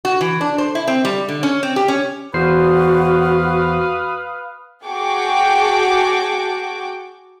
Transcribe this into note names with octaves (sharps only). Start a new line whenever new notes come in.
F#4
E3
D4
C5
E4
C4
G3
D3
C#4
C4
G4
C#4
E2 F#4 B4 C5 F5 D#6 C7
F#4 G#4 G5 A5 C#6 D6